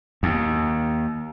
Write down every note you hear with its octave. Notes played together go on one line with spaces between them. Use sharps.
D#2